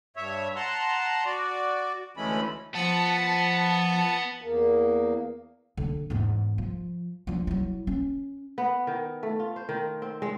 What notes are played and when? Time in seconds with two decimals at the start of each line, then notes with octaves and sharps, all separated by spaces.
0.16 G2 C#5 E5
0.56 F#5 A5 A#5 C6
1.25 F#4 D5
2.17 D2 E3 G#3 A3 C#4 B5
2.74 F3 B3 A5 C#7
4.42 E2 A#3
5.77 D3 D4
6.10 E2 G#2
6.58 F3
7.27 F3 D4
7.47 F#3 E4
7.87 C#4
8.58 B3
8.87 D#3
9.23 A3
9.39 F4
9.56 C5
9.69 D#3
10.02 C4
10.22 G#3